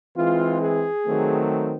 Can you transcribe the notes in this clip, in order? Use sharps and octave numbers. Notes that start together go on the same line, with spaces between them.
E3 G#3 C4 F4
G#4
D#3 F#3 A3 C4